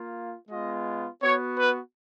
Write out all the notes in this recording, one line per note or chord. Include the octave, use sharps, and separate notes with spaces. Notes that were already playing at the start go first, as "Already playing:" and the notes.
Already playing: A#3 F4
G#3 B3 F4 D#5
B3 F#4 C#5
B4